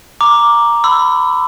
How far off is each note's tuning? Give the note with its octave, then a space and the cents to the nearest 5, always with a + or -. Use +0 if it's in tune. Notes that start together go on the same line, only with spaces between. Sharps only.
A#5 +0 D6 +0
B5 +30 E6 +10